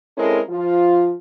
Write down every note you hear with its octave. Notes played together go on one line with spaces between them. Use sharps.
G#3 C4 C#4 E4 A4 A#4
F3 F4